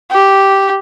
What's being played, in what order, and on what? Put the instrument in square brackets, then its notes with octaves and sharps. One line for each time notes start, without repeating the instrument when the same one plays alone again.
[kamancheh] G4